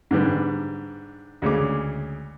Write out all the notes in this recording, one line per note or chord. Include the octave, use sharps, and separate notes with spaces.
G#2 D3 G3 B3
D2 C#3 G#3 D6